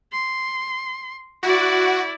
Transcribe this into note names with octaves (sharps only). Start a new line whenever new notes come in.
C6
E4 F#4 D5